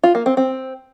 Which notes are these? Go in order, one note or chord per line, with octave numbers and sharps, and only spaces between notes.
F4
A#3
C4
C4